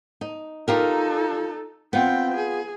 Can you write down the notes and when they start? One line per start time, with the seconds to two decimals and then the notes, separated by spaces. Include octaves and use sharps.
0.21 D#4
0.68 D#4 F4 G4 A4 A#4
1.93 B3 C4 F4 G5
2.36 G#4